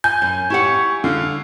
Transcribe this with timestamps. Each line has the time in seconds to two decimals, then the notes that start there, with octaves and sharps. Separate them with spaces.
0.04 G#5 G6
0.22 F#2
0.50 E4 G4 C#5 F#5
1.04 D3 F5